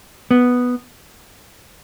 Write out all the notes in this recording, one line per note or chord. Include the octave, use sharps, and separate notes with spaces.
B3